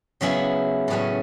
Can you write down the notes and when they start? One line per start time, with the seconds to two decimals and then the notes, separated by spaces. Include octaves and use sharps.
0.21 C#3 F#3 B3 E4 G#4
0.88 A2 F#3 C#4 G#4 B4